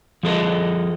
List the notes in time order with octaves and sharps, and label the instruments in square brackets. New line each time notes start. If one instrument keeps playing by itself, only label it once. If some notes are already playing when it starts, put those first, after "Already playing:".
[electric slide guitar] F3 G#4 A4 D#5